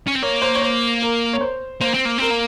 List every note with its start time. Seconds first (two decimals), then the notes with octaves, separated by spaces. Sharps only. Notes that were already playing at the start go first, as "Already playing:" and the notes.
0.07 C#4
0.15 C4
0.22 A#3 C#5
0.42 C5
0.55 C#5
0.62 C5
1.02 A#4
1.33 C#5
1.41 C5
1.81 A#3 C5
1.94 C4
2.05 A#3
2.18 C4 A#4
2.30 A#3